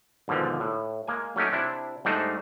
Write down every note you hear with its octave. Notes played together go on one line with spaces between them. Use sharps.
D#2 G#2 B2 D3 F3
A2
G#3 A#3 G#5
F#3 A3 C#4 D#4 G4
C3 D4 E4
G#2 G3 A3 D4 D#4 C5